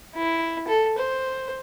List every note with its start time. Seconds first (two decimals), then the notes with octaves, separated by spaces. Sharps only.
0.15 E4
0.67 A4
0.98 C5